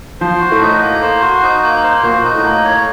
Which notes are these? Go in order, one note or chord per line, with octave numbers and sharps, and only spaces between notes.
F3 C5
F#4
A2 A3
D#4
A#3
C5
F#4
D#4
A#3
C5
A#2 A#3 F#4
D#4
A2 A3
A#3
C#5